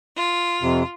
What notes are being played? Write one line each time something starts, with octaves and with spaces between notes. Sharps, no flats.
F4
F2 C3